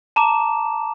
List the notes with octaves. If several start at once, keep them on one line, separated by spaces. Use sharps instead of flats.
A5 A#5 D6 E7